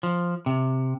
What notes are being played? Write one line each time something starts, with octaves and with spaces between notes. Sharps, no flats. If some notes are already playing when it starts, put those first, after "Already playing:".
F3
C3